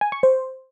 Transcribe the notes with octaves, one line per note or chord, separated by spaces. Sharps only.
G#5
C#6
C5